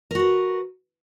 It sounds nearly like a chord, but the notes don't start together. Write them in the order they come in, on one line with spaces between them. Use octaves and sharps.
A#4 F#4 B4